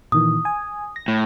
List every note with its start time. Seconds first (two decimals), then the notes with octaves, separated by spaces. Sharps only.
0.12 A#2 D#3 E3 D#6
0.45 G#5
0.96 A#6
1.08 A2